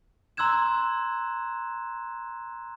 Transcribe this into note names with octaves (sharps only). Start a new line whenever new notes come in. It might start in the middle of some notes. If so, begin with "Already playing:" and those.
A#5 C6 E6 F#6 G#6 E7